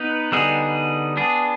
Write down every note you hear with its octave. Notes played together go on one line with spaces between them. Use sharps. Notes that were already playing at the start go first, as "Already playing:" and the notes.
Already playing: B3 D#4 B4
D3 G3 B3 D#4 G#4
B3 D4 G#4